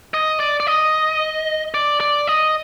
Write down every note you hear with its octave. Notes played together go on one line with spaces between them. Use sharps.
D#5
D5
D5
D#5
D5
D5
D#5